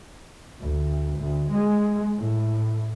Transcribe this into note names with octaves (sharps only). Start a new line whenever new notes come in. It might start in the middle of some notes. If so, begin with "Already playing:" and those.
D2
D2
G#3
A2